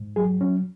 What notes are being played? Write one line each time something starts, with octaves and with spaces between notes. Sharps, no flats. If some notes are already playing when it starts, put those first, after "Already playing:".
Already playing: G#2
F#3 G#4
F#3 C#4